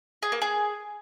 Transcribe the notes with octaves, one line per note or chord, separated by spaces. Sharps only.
G#4
A#3
G#4